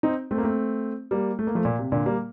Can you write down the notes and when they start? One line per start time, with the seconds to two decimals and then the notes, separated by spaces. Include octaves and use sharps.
0.03 C4 D#4
0.31 A3 C4
0.38 A#3
0.43 A3 C4
1.11 G3 A#3
1.39 A3
1.47 A#3
1.55 F3 A3
1.65 A#2
1.79 C3
1.92 A#2 D3
2.06 G3 A#3